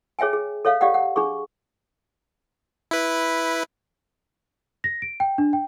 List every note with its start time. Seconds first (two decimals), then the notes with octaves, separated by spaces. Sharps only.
0.19 G#4 C#5 E5 G5 G#5
0.33 G#4
0.65 A4 C#5 E5 F5
0.81 G4 D5 D#5 F5 F#5
0.94 F#5
1.16 D4 G#4 C#6
2.91 E4 B4
4.84 A#6
5.02 D7
5.20 G5
5.38 D4
5.53 G5